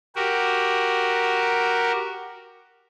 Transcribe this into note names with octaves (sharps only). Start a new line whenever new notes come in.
F#4 G4 A#4